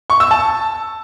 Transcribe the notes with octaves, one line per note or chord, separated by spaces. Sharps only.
C#6
E6
A5